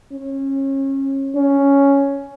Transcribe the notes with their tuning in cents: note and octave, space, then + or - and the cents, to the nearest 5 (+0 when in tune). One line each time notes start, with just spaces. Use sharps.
C#4 -30
C#4 +5